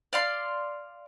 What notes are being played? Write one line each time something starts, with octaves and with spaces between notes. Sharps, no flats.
D5 F5 C6